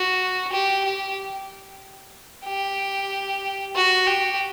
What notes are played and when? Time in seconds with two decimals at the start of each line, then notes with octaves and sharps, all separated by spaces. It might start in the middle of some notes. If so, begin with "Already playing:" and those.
Already playing: F#4
0.52 G4
0.84 G4
2.46 G4
3.76 F#4
4.07 G4